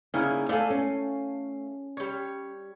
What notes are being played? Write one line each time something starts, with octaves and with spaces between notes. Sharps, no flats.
C#3 G3 A#3 C#4 D#4 E4
A3 A4 D5 F5 G#5
C#4
G3 C#5